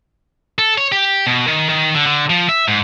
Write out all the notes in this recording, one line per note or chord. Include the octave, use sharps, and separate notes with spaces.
A4
C#5
G4
B2
D#3
D#3
D3
D3
F3
E5
G#2